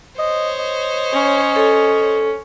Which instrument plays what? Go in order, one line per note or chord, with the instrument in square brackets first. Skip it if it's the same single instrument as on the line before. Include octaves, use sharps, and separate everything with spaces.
[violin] C5 C#5 [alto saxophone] D#5
[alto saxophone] D#5
[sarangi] C#4
[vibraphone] A4